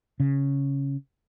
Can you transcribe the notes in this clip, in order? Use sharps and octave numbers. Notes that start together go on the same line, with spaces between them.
C#3